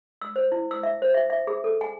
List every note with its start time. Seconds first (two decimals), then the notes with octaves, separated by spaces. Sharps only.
0.22 E6
0.36 C5
0.52 E4
0.71 E6
0.83 E5
1.02 C5
1.14 E5
1.30 E5
1.47 G#4
1.64 A4
1.81 G#5